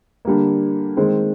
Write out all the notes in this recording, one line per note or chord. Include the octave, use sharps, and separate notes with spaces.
D3 G3 A#3
D#3 G#3 C4